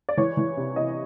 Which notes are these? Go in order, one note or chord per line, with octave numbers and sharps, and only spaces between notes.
D5
E3 C#5
E3
C3
C3 D#5